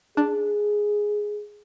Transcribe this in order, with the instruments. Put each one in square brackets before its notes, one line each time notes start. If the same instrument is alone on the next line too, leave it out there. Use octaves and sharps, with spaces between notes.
[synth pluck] D4 [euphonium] G#4